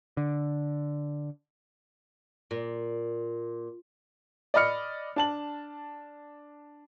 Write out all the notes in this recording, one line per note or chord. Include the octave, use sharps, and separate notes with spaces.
D3
A#2
D5 D#5 B5 F6 C#7
D4 A5 F#7